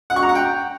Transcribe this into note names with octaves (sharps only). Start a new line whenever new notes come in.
F#5
C#6
A#5
F#5
G5